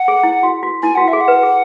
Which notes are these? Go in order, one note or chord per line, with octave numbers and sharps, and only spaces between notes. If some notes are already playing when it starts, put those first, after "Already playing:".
Already playing: F#5
G#4
E4
F#4
F#4
E4 G#5
F#4 F#5
F#4 E5
G#4
F#5
B4
G#4